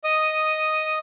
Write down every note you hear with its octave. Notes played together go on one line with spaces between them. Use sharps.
D#5 D#6